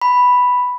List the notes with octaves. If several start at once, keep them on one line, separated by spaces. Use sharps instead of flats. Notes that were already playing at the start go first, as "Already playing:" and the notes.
B5